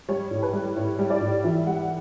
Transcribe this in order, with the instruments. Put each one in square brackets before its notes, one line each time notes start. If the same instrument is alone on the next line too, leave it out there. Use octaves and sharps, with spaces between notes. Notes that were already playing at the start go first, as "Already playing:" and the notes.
[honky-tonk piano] G3 C#5
A2
B4
G3
A2 C#5
G3
D5
A2
E3 E5
G3 F#5